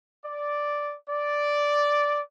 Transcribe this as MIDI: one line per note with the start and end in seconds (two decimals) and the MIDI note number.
0.24 0.96 74
1.10 2.20 74